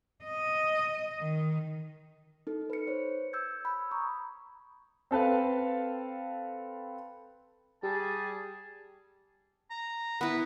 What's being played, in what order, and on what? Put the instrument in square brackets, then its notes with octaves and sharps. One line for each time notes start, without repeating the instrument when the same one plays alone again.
[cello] D#5
D#3
[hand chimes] D#4 A4
B4 C#7
C5 C#5
E6 G6 G#6
B5
A#5 C#6 D#6
[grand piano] C4 A4 B4 F5
[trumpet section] G3 G#4 [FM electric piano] G4 [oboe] A5
[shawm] A#5
[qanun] B3 E4 [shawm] B4